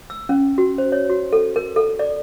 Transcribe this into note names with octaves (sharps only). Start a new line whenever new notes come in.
E6
C#4
F#4
C5
C#5
F#4
A4
A#4
A4
D5